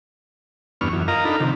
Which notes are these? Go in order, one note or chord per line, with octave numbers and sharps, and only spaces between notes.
E2 G2 B3 D4 C#6 F6
F#2 E3
F4 A#4 D#5 F5 A#5
D4 D#4 A4 B5
C3 D#3 F3